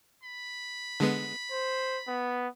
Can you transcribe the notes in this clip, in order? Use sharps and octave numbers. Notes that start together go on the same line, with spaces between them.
B5
D3 G#3 B3
C5
B3